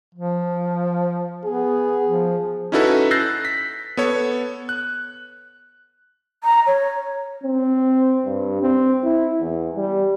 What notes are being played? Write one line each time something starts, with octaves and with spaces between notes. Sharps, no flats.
F3
B3 G#4
F3
C#4 D#4 E4 F#4 A4 B4
E6 F#6 G6 A6 A#6 C7
B6
B3 A4 C#5
F#6
A#5
C#5
C4
G2
C4
E4
E2
G3